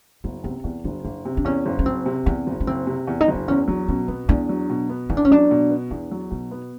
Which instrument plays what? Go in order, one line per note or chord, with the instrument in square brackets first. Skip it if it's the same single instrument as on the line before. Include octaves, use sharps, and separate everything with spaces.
[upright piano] F#1 [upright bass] B3
[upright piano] C3 [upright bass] B3
[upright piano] E2 [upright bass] B3
[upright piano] F#1 [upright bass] D4
[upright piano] F#1 [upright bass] D4
[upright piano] C3
[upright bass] D4
[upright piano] E2 [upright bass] C#4
[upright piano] F#1
[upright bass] C#4
[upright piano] F#1 [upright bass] C4
[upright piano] C3
[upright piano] E2 [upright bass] C4
[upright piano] F#1
[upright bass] C#4
[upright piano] F#1 [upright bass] C4
[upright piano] C3
E2
[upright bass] D#4
[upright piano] F#1
[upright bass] D4
[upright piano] E2 [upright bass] C#4
[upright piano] F#3 [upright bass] D4
[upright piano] B2 [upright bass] C#4
[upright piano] B3 [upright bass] C4
[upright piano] E2 [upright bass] D4
[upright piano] F#3
B2
B3
[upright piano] E2 [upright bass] D#4
[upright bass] D4
C#4
[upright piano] F#3 [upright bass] D4
[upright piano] B2
B3
[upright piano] E2 [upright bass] D4
[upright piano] F#3
[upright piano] B2 [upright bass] D#4
[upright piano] B3